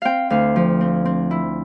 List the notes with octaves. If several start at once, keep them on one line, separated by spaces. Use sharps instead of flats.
C4 F5 G5
D2 F5
F3
C4
C4
E4